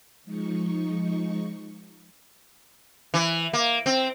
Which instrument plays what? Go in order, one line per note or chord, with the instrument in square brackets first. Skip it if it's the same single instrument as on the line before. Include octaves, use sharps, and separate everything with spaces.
[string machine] F3 G#3 D#4 C#6
[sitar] E3
A#3
C4